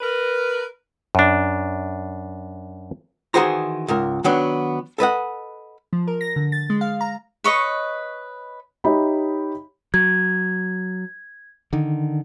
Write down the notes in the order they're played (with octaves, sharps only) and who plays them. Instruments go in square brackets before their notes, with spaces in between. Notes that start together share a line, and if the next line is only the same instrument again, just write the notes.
[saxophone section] A#4 B4
[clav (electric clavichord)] F#2 D4
[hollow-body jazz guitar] D#3 E3 F#4 G#4 C5 A#5
C#2 G#2 A#4
D#3 F#3 B3 D4
A4 B4 D#5 F#5
[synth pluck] F3
A#4
A#6
D3
A6
G#3
F5
A#5
[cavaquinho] B4 C#5 D#5 C#6
[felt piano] D#4 G4 C#5 D#5 E5 B5
[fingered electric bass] F#3 [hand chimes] G#6
[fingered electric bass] D3 D#3